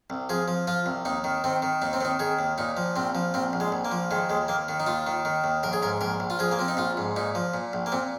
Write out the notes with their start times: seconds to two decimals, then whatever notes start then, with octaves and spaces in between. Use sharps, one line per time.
0.10 C2
0.29 F3 G#4
0.48 F3
0.67 F3 F4
0.86 C2
1.05 D#2 D#4
1.24 D#3
1.44 D#3 C4
1.62 D#3
1.82 D#2 D#4
1.93 C4
2.01 D#3 D#4
2.19 D#3 G#4
2.39 D#2
2.58 A#2 D#4
2.77 F3
2.96 A#1 C4
3.15 F3
3.34 A#1 C4
3.53 A#1
3.60 G#3
3.72 A#1
3.85 A#3
3.92 F3
4.11 D#3 G#3
4.30 D#2 G#3
4.48 D#2 A#3
4.68 D#3
4.80 D#4
4.86 D#2 F4
5.07 D#3
5.25 D#3
5.44 D#2
5.63 A#1 A#4
5.73 G#4
5.82 G#2 A#4
6.01 A#1 A#4
6.20 A#1
6.30 F4
6.39 F3 G#4
6.51 A#3
6.59 F3 C4
6.68 D#4
6.77 A#1 F4
6.97 G#2
7.16 A#2 D#4
7.35 F3
7.54 A#2
7.73 A#1
7.86 A#3
7.92 A#2 C4